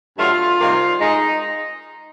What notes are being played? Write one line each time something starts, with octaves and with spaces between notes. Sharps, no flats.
G2 D3 F#3 A3 F4
C3 D#3 G3 A#3
G#3 D#4